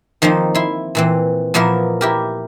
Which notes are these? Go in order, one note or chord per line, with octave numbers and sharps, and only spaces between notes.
D#3 F3 A#3 C4 D#4
E4 C6
A#2 E3 C4
A#2 F3 A#3 B3 E4 A#4
E4 G4 A#4